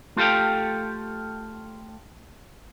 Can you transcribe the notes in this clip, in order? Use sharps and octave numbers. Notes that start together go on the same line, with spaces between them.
A3 F4 G4 A4 F5 G5